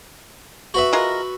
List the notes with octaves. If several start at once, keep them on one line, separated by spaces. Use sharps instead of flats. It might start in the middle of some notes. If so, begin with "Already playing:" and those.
F#4 B4 E5
G#3 F4 A#4